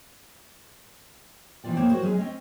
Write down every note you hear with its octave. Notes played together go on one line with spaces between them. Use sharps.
B2 E3 F3 F4 D5 G5
F2 A#3 C5 C#5 G5
F#4 G#4 A#4 C5 C#5
F#3 G#3 C#4 G#4
C4 C#4 C#5 D#5